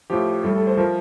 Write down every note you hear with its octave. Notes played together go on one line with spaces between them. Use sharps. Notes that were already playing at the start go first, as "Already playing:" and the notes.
A2 F3 G4
A2 G3 A4
A4
C5
F3 A#4